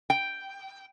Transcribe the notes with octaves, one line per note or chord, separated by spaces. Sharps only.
G5